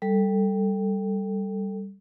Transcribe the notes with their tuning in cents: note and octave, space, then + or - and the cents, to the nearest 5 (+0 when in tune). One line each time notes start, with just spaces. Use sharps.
G3 +0 A4 +10